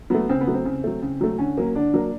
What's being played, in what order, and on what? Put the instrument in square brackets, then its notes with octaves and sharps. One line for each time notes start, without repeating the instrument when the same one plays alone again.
[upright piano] F#3 A3 B3
C#3 C4
B3
F#3 A3
C4
C#3
F#3 A3
C#3
F#3 A3
D3 C#4
F#3 A#3
D3 D4
F#3 A#3